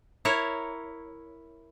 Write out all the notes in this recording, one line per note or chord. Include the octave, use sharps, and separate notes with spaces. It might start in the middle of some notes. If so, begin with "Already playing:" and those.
E4 A#4 C#5